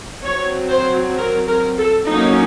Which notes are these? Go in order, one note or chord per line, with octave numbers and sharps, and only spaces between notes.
F#3 C4 C#5
C5
A#4
A#4
A4
F#3 A#3 C#4 D#4